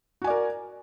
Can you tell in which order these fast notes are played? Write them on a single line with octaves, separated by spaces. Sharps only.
F#4 G#5 D5 A#4